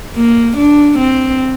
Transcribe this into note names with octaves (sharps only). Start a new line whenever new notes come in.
A#3
D4
C4